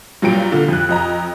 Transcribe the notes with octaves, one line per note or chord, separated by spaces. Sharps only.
G2 A#2 F#3 G4 D7
A#2 D3 F4
F2 F#6
F2 D#5 A#5